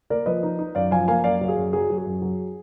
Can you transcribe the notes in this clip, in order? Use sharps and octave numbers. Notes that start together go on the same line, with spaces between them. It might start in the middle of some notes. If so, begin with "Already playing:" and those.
A#3 A#4 D5
F3 B4 D#5
D#4
D#4
F#2 D5 F5
F3 F5 G#5
A#3 F5 G#5
F#2 D5 F5
F#3
G#4
F#2
F#3 G#4
F#3
G#4
F#2
F#3